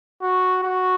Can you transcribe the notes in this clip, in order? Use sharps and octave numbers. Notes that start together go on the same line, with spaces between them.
F#4
F#4